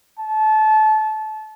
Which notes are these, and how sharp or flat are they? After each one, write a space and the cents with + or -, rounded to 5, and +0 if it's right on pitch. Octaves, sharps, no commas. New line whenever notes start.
A5 -25